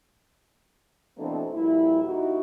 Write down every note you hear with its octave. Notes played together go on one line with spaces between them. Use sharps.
B2 E3 A3 A#3 C4 D4
F2 A#2 G3 E4
D#2 D#4 E4 F#4